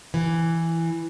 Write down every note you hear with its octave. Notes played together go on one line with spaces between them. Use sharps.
E3